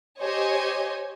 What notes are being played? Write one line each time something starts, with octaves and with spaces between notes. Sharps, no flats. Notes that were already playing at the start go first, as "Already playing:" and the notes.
G4 C5 C#5 D#5 G#5